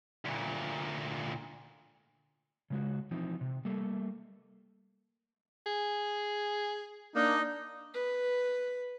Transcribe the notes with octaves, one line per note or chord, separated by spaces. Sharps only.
D2 A#2
C#3 G#3 F#4
E3 F3 C4 D#4
C3
G3 A3 A#3 A4
G#4
A#3 D4 D#4
B4